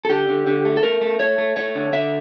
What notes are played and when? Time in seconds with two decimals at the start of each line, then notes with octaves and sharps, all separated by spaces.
0.05 A4
0.10 D3 G4
0.28 D3
0.47 D3
0.65 A3
0.77 A4
0.83 A3 A#4
1.01 A3
1.20 A3 C#5
1.38 A3
1.57 A3 C#5
1.75 D3
1.93 D3 E5